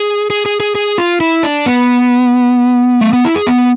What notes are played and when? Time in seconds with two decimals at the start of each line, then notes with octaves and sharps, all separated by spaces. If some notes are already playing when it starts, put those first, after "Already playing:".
Already playing: G#4
0.30 G#4
0.46 G#4
0.60 G#4
0.75 G#4
0.98 F4
1.21 E4
1.43 D4
1.66 B3
3.01 A3
3.13 B3
3.25 E4
3.35 G#4
3.47 B3